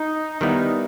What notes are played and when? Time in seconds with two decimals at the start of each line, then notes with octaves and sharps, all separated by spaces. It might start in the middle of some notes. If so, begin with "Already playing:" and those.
Already playing: D#4
0.41 D#3 G3 B3 D#4 E4